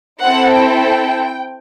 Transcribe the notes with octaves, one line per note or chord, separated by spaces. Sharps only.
C4 E4 A4 F#5
G5